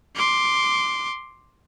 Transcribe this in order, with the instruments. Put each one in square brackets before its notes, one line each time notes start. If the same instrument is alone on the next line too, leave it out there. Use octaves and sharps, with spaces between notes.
[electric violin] C6 D6